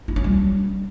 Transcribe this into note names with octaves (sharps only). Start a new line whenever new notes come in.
E4
C#4
G3